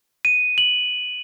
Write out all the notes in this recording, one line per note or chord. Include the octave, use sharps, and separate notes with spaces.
D#7
F#7